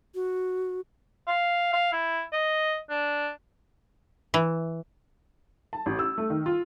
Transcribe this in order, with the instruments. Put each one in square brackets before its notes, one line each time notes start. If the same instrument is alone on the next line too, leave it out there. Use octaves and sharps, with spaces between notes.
[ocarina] F#4
[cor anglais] F5
F5
E4
D#5
D4
[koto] E3
[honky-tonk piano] A5
A1
E6
A3
D#3
F4